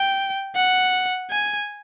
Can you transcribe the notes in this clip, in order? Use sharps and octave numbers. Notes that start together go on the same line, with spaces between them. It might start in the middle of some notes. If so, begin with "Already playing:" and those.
Already playing: G5
F#5
G#5